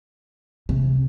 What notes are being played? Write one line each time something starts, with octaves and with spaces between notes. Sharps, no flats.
C3